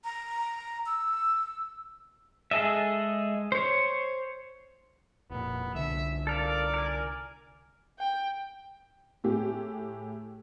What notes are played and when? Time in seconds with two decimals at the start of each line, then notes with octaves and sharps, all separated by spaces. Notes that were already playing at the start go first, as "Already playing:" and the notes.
0.04 A#5
0.86 E6
2.51 G#3 G#4 A4 D#5 E5
3.52 C5 C#5
5.30 F1 A#2 B3
5.75 C2 D3 E5
6.27 A4 A#4 D5 F5
6.74 A#4 G#5
7.99 G5
9.24 A2 A3 G4 G#4